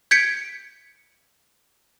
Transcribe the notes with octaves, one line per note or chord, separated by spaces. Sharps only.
G6 G#6 B6 C#7 D7